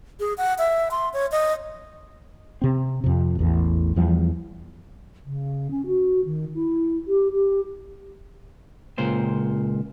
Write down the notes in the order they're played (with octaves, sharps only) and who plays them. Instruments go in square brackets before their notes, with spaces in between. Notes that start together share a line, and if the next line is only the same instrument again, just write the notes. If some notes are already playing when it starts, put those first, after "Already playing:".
[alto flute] G#4
F#5
E5
C6
C#5
D#5
[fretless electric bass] C3 C4
F2 C3
A1 E2
E2 F3 G3
[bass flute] C#3
C#4
F#4
D#3
E4
G4
G4
[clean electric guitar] C#2 A#2 C5